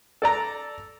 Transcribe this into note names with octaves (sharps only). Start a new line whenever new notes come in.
A4 D5 A#5